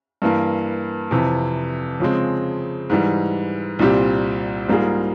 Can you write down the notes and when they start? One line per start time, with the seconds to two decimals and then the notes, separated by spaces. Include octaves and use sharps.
0.22 G2 E3 A#3
1.11 F2 C3 E3
2.00 C#3 F3 G#3 C4
2.90 G#2 E3 G3
3.79 C2 A#2 G3 C4 G4
4.68 G#2 G3 A#3 F4 G#4